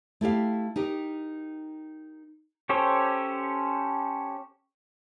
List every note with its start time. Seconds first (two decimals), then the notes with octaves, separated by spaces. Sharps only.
0.21 A3 E4 G4 F5
0.76 D#4 G4 A#4
2.69 C#4 G4 A4 C5 C#5